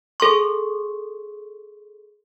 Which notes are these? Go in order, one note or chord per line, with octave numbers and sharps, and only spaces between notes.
G#4 A4 C6 C#6